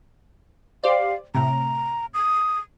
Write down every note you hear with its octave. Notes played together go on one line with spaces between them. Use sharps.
G4 C5 D5 F5
A2 C3 A#5
D#6